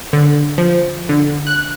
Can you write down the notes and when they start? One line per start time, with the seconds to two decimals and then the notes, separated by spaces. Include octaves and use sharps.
0.13 D3
0.58 F3
1.09 D3
1.47 F#6